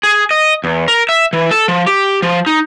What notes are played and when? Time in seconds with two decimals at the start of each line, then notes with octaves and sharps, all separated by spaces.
0.03 G#4
0.31 D#5
0.64 E2
0.88 A#4
1.09 E5
1.33 E3
1.51 A4
1.68 F3
1.87 G4
2.22 F3
2.46 D#4